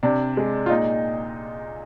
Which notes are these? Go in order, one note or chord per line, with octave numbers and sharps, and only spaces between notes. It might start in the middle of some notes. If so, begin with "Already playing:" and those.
C3 D4
G#3
F4
A#2 D#4